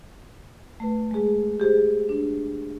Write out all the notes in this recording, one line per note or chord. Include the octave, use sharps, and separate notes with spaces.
A3 B4
G#3 G#4
G4 G#4 C5
D4